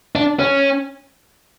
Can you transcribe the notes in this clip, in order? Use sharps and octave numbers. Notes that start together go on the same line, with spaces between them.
D4
C#4